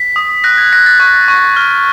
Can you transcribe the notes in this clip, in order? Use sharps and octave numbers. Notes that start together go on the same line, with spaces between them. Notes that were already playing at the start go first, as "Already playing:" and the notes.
Already playing: B6
D#6
F#6 A#6
G#6
F#6 A#6
A6
C#6
C#6
F6